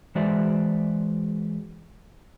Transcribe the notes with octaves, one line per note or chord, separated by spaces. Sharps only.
E3 G#3 F#4 C5 D5 E5